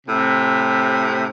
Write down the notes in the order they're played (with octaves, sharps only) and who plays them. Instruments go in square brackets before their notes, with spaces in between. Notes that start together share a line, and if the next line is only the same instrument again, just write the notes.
[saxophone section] A2 C3